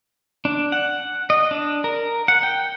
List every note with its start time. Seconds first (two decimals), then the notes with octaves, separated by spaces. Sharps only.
0.45 D4
0.72 F#5
1.30 D#5
1.51 D4
1.84 A#4
2.28 F#5
2.43 G5